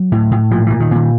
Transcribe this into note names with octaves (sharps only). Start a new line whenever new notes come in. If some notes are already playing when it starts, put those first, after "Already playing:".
Already playing: F#3
A2
A2
A#2 F3
A#2 E3
D#3
A#2 D#3